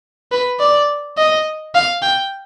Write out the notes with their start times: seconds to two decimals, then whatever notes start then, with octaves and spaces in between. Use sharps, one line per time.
0.32 B4
0.60 D5
1.18 D#5
1.75 F5
2.02 G5